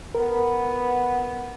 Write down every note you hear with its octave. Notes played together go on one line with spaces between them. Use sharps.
B3 A#4